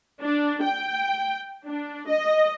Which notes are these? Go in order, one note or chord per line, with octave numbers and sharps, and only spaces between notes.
D4
G5
D4
D#5